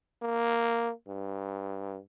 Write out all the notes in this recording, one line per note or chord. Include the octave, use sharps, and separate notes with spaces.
A#3
G2